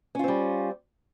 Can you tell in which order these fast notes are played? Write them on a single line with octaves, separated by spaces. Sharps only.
C#4 F4 C4 G3